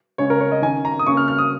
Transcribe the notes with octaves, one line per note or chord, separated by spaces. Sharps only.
C#3 G#3 C#4 C#5
A#4
C#5
D#5
D#3 C#4 G#5
A#5
D#6
C#3 A#3 C#4 C#6
F6
F6
D#6